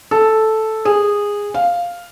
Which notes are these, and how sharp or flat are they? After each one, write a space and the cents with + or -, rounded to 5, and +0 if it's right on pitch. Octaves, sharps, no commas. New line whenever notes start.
A4 -5
G#4 -15
F5 +0